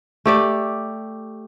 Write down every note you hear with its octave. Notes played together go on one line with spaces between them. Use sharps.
A3 G4 D5